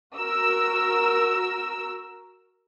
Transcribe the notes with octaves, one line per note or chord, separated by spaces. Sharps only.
F#4 A#4 E6